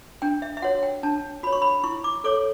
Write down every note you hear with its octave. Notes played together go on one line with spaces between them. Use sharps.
D4 G5
E5
E5
F#4 C#5 F#5
G5
D4 A5
F#4 C#5 B5
C#6
B5
E4 C#6
D6
A4 C#5 D6